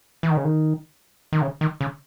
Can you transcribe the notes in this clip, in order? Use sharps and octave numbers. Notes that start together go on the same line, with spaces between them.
E3
D#3
C#3
D#3
D#3
C#3
D#3
C#3